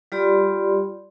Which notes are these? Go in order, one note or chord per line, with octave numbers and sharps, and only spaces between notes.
G3 F4 G4 D5 B5 C6